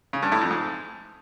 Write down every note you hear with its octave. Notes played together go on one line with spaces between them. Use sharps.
C#3
G2
A2
F2
G#2